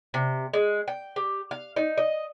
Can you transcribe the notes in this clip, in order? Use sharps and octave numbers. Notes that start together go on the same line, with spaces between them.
C3
G#3
G5
G4
F5
D#4
D#5